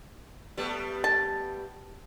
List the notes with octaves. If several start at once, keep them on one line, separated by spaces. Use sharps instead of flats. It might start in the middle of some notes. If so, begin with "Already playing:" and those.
G3 A3 B3
A5